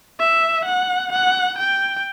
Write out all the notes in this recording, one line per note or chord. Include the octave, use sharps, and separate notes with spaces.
E5
F#5
F#5
G5